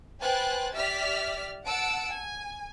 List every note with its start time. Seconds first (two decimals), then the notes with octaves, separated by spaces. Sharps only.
0.20 B4 C5 G5 G#5 F#6 A6
0.74 G4 D5 E5 F6 B6
1.66 F#5 A5 E6 D7
2.15 G#5